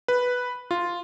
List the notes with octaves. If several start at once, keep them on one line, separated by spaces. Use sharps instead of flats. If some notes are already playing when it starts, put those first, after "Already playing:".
B4
F4